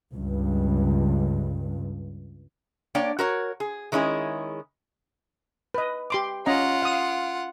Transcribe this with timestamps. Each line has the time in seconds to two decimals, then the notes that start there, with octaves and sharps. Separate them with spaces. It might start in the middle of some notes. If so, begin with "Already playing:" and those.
0.13 C#2 G2
2.95 A#3 D4 C#5 D5 G5
3.19 F#4 A#4 C#5
3.60 G#4
3.92 D#3 G#3 C#4 E4 G#4
5.74 B4 D#5
6.10 G4 C6 D6
6.46 C#4 F4 D#5 F#5 A#5
6.82 F5 D#6